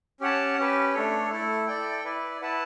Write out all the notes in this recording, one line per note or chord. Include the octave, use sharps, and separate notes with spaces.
C#4 G4 C#5 F#5 A5
C#4 G4 B4
A3 D4 A4 C#5
A3 E4 A4
E4 A4 D5 G5
E4 B4 D5
E4 B4 F#5 A5